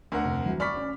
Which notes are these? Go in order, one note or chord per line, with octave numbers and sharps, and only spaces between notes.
D2 D4 A#4 F#5
F1
E3 F#3
D5 B5 C#6 F6 B6
C#4